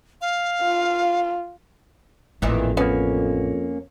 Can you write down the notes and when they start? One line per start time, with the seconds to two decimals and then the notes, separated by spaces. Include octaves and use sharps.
0.21 F5
0.63 F4
2.42 A1 F2 A#2 D#3 E3
2.77 A#3 B3 C#4